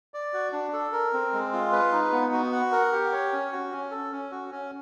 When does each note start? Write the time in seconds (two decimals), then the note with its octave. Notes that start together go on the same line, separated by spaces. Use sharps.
0.14 D5
0.34 F#4
0.53 D4
0.73 A4
0.92 A#4
1.13 C4
1.33 G#3
1.53 F4
1.72 B4
1.92 D#4
2.13 B3
2.33 F#4
2.52 F#5
2.72 A#4
2.92 G4
3.13 C#5
3.33 C#4
3.52 F#4
3.72 C#4
3.91 A4
4.12 C#4
4.31 F#4
4.52 C#4